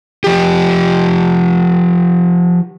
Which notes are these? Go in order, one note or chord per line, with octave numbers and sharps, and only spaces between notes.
F3 G4